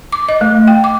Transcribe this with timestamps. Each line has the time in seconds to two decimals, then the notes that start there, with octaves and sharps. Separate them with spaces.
0.13 D6
0.29 D#5
0.41 A3
0.68 G5
0.84 D6